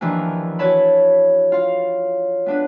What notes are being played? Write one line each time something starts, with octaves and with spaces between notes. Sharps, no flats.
D#2 E3 F3 A#3 D4
E4 F#4 B4 C#5 A5 B5
F4 F5
B3 D4 B4